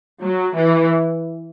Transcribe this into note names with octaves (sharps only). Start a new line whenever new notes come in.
F#3
E3